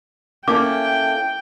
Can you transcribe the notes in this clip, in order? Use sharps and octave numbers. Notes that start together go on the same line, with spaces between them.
A#3 C#4 E4 A4 G5 D6